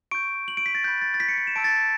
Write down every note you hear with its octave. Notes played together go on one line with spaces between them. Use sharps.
C#6 G6 D7
F#7
D7
B6
A6
B5 F#6 G6
A6
A6
B6
C#7
B6
E7
A5 C#6 E6 G6 D7
A6